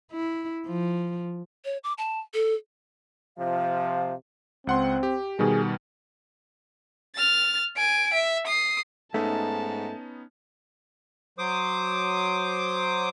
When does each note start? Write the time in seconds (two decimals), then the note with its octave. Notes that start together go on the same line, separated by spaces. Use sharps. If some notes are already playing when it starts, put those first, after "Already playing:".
0.12 E4
0.66 F3
1.65 C#5
1.84 D6
1.98 A5
2.34 A4
3.38 C3 F3 F5
4.67 C#2 C4 F#5 C6
5.03 G4
5.39 B2 D#3 G3 G#4
7.15 F6 A6
7.76 G#5 D7
8.14 E5
8.47 D#6 C7
9.14 G#2 A3 B3 C#4 D#4 A5
11.39 F#3 C5 D6 D#6